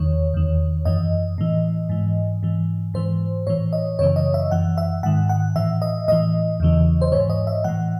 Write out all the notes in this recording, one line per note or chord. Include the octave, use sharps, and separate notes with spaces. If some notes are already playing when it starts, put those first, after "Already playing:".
Already playing: E2 D#3 C#5
E2 D#3
F#2 E3 D#5
A2 E3
G#2 E3
G#2 E3
G#2 E3 C5
A2 E3 C#5
D#5
F#2 C#3 E3 C#5
D#5
E5
F#2 E3 F#5
E5
G#2 D#3 F#5
F#5
A2 E3 E5
D#5
A2 E3 D#5
E2 C#3 E3
C5
G#2 E3 C#5
D#5
E5
A2 E3 F#5